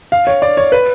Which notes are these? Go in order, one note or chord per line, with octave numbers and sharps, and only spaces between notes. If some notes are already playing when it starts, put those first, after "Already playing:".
F5
C#5
D5
C#5
B4